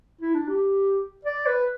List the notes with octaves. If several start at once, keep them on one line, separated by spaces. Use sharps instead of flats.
E4
D4
G4
D5
B4